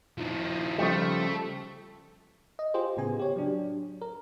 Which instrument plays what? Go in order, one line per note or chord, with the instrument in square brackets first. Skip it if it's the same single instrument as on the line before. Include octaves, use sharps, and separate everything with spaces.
[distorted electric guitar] D#3 F3
[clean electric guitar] C#3 F3 G3 [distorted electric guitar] A3
[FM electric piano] D#5
F4 G4 G#4 C5
A2 C#3 B3 G#5
G4 C#5
F#3 D4
A#4